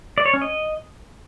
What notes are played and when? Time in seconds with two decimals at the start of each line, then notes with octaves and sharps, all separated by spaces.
0.18 D5
0.26 C#5
0.34 C#4
0.42 D#5